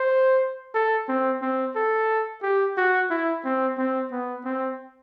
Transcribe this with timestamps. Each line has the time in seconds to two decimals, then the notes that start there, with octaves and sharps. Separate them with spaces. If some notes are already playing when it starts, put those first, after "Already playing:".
Already playing: C5
0.75 A4
1.08 C4
1.42 C4
1.76 A4
2.43 G4
2.78 F#4
3.10 E4
3.44 C4
3.78 C4
4.12 B3
4.45 C4